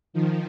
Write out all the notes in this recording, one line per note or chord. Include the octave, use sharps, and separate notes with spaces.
D#3 F3